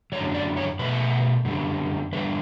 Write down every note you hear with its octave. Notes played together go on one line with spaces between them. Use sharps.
F#2 D3 F#3 C#5
D5
C#5
B2 A3 B4
F#2 D3 G3
E2 D3 G3 B4